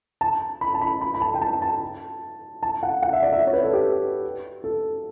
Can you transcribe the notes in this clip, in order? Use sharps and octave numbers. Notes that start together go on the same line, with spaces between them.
A5
B5
A5
B5
B5
B5
A5
G5
A5
A5
A5
F#5
F#5
E5
D5
E5
C#5
B4
A4
G4
A4